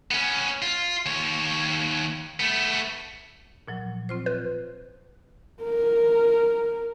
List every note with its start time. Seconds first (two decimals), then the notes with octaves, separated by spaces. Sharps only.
0.11 B3 C#4
0.62 F4
1.06 D#2 C#5
2.40 A3 B3
3.68 A#2 F3 F#3
4.09 C4 F4 C5
4.26 B4
5.62 A#4